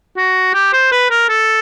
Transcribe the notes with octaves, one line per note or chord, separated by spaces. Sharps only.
F#4
G4
C5
B4
A#4
A4